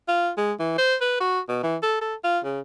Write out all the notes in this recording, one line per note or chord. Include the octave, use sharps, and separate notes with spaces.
F4
G#3
E3
C5
B4
F#4
B2
E3
A4
A4
F4
C#3